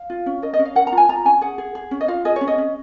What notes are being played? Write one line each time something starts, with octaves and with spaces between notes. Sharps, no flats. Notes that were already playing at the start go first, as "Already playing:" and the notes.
Already playing: F5
F4
C#4
A#4 D#5
D#5
C#4
F5
A#4 F#5
A#5
F4
G#5
F4 A#5
C#4 G#5
G#4 F#5
G#4
G#4
C#4
D#5
F4 F5
G#4 D#5
C#5
C#4
D#5
C#4